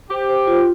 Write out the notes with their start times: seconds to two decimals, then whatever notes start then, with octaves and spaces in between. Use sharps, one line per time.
0.11 G4 C5
0.29 C5
0.47 F4